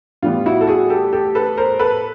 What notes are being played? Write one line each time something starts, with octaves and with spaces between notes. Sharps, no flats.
A2 E3 G3 B3 F4
E4 F#4
A4
F#4 G#4
G4 A4
G4 A4
A4 B4
A#4 C5
A4 B4